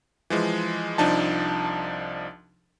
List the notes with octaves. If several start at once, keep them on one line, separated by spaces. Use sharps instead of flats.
E3 F3 G#3
C2 F3 D4 D#4 A5